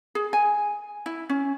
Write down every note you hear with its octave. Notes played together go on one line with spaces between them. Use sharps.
G#4
G#5
E4
C#4